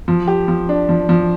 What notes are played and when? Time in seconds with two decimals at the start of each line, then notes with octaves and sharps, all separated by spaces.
0.08 F3
0.27 G4
0.48 F3
0.69 D4
0.89 F3
1.09 F3